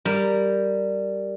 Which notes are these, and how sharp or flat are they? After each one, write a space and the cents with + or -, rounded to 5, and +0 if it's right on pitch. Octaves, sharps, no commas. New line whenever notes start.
G3 +0 A#4 -10